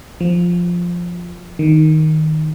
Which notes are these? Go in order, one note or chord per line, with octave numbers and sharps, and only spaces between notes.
F3
D#3